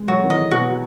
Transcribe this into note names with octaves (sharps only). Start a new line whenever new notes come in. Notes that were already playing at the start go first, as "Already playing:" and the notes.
Already playing: G#3
F#3 F#4
D#3
E3 D#5
B2 F#4